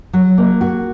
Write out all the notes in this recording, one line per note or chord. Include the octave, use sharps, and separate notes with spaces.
F#3
A#3
F#4